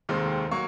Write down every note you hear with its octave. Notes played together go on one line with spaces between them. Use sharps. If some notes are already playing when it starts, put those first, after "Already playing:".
F1 D#2 D#3 G#3 C4
F#3 A#3 C#6